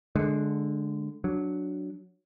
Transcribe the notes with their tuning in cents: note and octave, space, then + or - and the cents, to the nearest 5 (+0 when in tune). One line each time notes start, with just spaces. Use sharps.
D3 +0 G#3 +15
F#3 +0 D4 +0